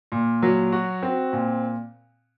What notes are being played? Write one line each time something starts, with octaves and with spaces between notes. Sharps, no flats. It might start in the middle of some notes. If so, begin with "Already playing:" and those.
A#2
F#3
F#4
C4
A#2